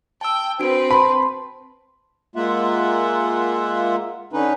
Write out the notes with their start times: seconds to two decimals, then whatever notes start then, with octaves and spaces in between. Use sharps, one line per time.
0.21 G5 A5 E6
0.60 C4 D4 F#4 B4 D7
0.91 A5 B5 C6
2.36 G#3 A#3 F4 E5 F#5
4.33 D3 C#4 D#4 B4